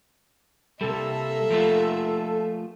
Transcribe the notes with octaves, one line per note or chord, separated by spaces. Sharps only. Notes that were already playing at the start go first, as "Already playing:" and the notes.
C3 G3 A#3 A4 E5
F3 A3 F4